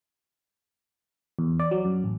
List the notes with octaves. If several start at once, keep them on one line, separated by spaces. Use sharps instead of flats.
E2
D5
F#3
F#2
A1